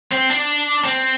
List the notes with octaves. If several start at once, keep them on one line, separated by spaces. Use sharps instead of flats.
C4
D4
C4